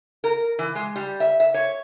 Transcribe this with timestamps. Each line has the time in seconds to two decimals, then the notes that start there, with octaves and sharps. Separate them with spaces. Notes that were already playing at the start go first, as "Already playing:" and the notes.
0.24 A#4
0.59 E3
0.75 G#3
0.96 G3
1.20 E5
1.40 E5
1.54 C#5